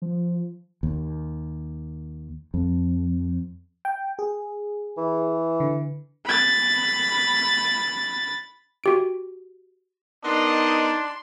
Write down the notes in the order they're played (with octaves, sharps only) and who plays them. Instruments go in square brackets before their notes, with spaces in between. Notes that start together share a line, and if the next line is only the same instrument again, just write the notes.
[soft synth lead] F3
[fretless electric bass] D#2
F2
[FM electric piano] G5
G#4
[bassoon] E3
[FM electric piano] D3
[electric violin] B5 A6
[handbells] F#4 G4 D7
[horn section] B3 A#4 D#5 [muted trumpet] D4 [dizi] D#4 [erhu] C6